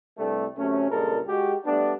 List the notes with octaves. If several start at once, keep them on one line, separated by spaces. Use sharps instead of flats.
C2 G2 G3 A3
F#2 C3 A3 C#4
C#2 G2 A#2 G#3 A4 A#4
G#3 F#4 G4
G3 A3 B3 D4